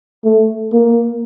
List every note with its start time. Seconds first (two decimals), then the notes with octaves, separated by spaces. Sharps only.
0.24 A3
0.73 A#3